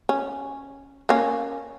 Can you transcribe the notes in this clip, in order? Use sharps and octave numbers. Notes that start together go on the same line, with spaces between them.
C#4
A#3 C#4